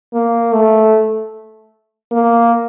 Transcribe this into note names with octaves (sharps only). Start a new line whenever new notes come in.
A#3
A3
A#3